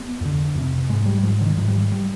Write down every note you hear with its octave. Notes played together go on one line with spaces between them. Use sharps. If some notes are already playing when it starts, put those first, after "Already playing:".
Already playing: B3
F2 D3
F2 C3
G#2 G#3
G3
G#2 F3
D3
D#3
G#2 F3
G3
G3